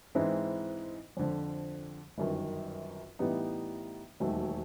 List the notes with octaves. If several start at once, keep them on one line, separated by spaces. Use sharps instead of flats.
G#2 E3 G#3 C4 E4
F2 D3 F3
G1 F#2 D#3
A2 E3 G3 B3 D#4
E1 D#2 D#3 F#3 A3